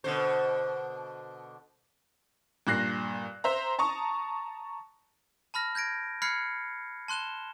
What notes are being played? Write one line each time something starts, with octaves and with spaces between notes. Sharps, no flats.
B2 D3 C5
G2 A#2 F#6 A#6 C7
C5 E5 A#5
A5 A#5 C#6 D#6
A5 B5 F6 A#6
G6 G#6 A#6 D7
B5 F6 F#6 G#6 C7 C#7
A5 C6 F#6 E7 G7